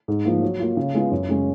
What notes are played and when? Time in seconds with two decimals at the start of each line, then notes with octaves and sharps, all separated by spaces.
0.08 G#2
0.25 F3 A#3
0.42 F#3
0.60 A#3 F4
0.77 C#3
0.95 G#3 B3 F4
1.11 F#2
1.28 C#3 G#3 C#4